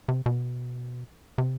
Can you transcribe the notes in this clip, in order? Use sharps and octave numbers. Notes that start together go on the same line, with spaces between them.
C3
B2
C3